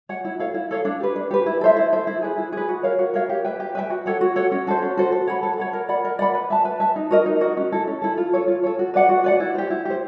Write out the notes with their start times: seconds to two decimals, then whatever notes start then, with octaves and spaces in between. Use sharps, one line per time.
0.09 C#5 F#5
0.25 E4
0.39 A4 C#5 F5
0.54 E4
0.71 A4 C#5 F5
0.85 D4
1.00 G4 B4
1.16 D4
1.31 G4 B4
1.46 E4
1.61 A4 C5 E5
1.76 E4
1.93 A4 C5 E5
2.07 E4
2.22 G#4 B4
2.38 E4
2.53 G#4 B4
2.69 F#4
2.83 A#4 C#5 F5
2.99 F#4
3.14 A#4 C#5 F5
3.29 G4
3.44 B4 E5 G5
3.60 G4
3.75 B4 E5 G5
3.90 F#4
4.06 A4 C#5 F#5
4.21 F#4
4.36 A4 C#5 F#5
4.52 C#4
4.67 F#4 A4 C5
4.82 C#4
4.97 F#4 A4 C5
5.12 A4
5.27 C#5 F#5 B5
5.43 A4
5.58 C#5 F#5 B5
5.73 A#4
5.89 D5 F#5 B5
6.04 A#4
6.19 D5 F#5 B5
6.35 B4
6.50 E5 A5
6.65 B4
6.80 E5 A5
6.96 D#4
7.11 F#4 A#4 D#5
7.26 D#4
7.41 F#4 A#4 D#5
7.57 C#4
7.72 E4 A4
7.87 C#4
8.02 E4 A4
8.17 F4
8.33 A4 C#5
8.48 F4
8.63 A4 C#5
8.79 F#4
8.94 B4 D5 F#5
9.09 F#4
9.24 B4 D5 F#5
9.40 E4
9.55 G4 C5
9.70 E4
9.85 G4 C5